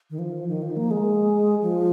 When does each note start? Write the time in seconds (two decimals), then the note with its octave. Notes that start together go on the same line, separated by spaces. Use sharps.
0.10 D#3
0.19 F3
0.48 D#3
0.62 F3
0.77 A#3
0.91 G#3
1.62 F3